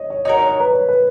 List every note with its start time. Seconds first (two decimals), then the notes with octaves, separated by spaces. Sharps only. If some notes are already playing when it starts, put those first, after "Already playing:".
Already playing: C#5 D#5
0.10 C#5
0.25 D#4 F#4 A#4 C#5
0.37 C#5
0.49 C#5
0.60 B4
0.73 C#5
0.89 B4